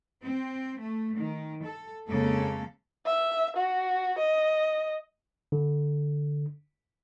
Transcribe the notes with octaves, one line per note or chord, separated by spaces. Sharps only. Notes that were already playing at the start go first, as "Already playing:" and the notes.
C4
A3
D#3
A4
F2 C#3 G#3 A#3 A4
E5
F#4
D#5
D3